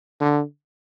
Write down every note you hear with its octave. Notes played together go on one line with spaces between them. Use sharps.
D3